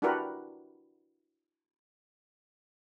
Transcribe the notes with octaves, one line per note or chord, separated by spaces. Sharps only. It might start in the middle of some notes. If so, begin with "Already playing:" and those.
D4 E4 F#4 G4 A#4 B4